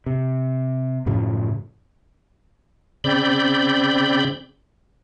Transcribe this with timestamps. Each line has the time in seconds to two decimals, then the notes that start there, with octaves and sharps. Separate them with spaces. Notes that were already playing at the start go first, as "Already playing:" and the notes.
0.06 C3
1.06 F#2 A2 C#3 F3
3.04 C#3 C4 D5 B5 G6